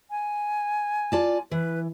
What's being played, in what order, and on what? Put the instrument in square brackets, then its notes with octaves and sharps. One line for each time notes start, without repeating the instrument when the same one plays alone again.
[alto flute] G#5
[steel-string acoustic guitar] F4 D5 A5
[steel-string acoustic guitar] E3 [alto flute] B4